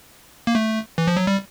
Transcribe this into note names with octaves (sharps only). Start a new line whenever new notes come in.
A#3
A3
E3
F3
F#3
G3